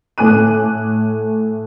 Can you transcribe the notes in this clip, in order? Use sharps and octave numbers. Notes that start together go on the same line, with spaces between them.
A2 A3 G#5 D6 F#6 D#7